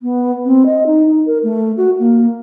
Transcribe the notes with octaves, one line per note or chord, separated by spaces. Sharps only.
B3
C4
D#5
D#4
D#4
A#4
A3
F#4
A#3